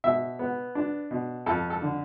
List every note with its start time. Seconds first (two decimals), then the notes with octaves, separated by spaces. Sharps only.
0.04 B2 E5
0.39 B3
0.75 D4
1.11 B2
1.46 F2 A4
1.70 A4
1.82 D3